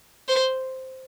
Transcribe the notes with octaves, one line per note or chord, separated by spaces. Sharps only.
C5